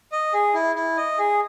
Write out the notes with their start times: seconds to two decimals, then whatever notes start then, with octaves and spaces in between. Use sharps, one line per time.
0.12 D#5
0.34 G#4
0.54 E4
0.76 E4
0.97 D#5
1.19 G#4